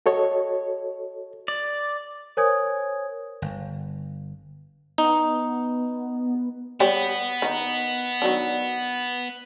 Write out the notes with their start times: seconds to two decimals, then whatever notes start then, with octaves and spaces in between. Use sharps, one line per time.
0.06 F#4 A4 C#5 D#5
1.48 D5
2.37 A#4 C5 C#5 G#5 D#6 G#6
3.42 G1
4.98 B3 D#4
6.80 G3 B3 G4 C#5
7.42 D#3 D#4
8.22 D#3 F#3 D4